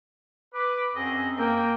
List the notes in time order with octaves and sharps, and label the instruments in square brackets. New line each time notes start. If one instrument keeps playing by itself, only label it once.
[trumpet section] B4 [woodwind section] D6
[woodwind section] F#2 C4 [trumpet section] F#4 G#4 D#5
[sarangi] A#3 [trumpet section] G5